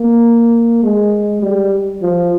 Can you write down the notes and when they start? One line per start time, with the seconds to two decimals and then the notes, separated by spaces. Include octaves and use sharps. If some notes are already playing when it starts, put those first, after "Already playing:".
Already playing: A#3
0.83 G#3
1.42 G3
2.02 F3